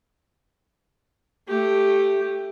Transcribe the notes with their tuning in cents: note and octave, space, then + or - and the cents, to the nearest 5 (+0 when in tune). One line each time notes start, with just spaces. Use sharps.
A3 +0 G4 +0